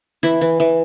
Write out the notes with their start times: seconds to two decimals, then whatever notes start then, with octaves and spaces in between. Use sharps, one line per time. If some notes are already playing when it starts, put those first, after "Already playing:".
0.23 E3 E4
0.41 E3
0.60 E3